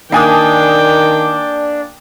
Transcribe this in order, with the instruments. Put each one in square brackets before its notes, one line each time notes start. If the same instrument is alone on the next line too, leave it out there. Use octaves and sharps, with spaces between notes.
[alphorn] D#3 [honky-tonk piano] A#3 G#5 D#6 [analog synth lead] D4 [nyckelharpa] G5 D6